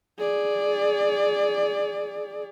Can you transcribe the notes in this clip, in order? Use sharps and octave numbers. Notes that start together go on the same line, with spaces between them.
G#4 D5